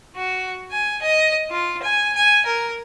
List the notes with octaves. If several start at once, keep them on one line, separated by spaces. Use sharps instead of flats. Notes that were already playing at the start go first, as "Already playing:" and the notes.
F#4
G#5
D#5
F4
G#5
G#5
A#4